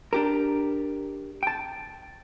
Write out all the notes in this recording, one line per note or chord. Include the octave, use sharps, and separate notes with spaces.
D4 G4 A#4
G5 A5